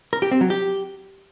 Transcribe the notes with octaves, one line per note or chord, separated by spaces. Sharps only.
A#4
G4
C4
F#3
G4